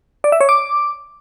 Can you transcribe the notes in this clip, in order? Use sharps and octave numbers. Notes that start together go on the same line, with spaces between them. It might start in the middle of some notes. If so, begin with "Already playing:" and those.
D5
E5
C#5
D6